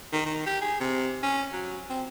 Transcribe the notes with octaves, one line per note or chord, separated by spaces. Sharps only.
D#3
D#3
G4
G#4
C3
C#4
F#3
C4